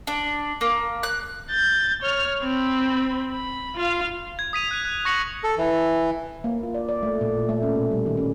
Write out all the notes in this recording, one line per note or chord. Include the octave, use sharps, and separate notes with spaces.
D4
A#3
F#6
G6 A6
C#5 F6
C4 B5
B5
F4 F5
G#6
D#6 B6 D#7 F7
F#6 D#7
F#6
C#6 A#6 C#7 F#7
A4
E3
A#3
F4
D5
D5
A3
A#2
A3
C#4
B2
G3
D#3
C#4